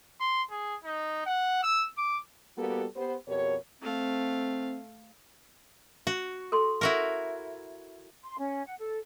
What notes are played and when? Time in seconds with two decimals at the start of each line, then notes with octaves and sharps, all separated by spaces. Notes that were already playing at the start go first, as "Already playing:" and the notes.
0.20 C6
0.50 G#4
0.84 D#4
1.26 F#5
1.63 E6
1.98 D6
2.57 G3 A#3 B3 F#4 G4 A4
2.96 B3 G4 C5
3.28 F2 B2 G4 A#4 C#5
3.81 A3 C4 F5
6.07 F#4
6.52 A4 C6
6.81 E4 F#4 A#4
8.24 C6
8.39 C#4
8.65 F#5
8.79 A4